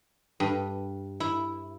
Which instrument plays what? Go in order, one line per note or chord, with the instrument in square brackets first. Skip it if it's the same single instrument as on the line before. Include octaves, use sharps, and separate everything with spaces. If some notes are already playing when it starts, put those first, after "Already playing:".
[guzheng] G2
E4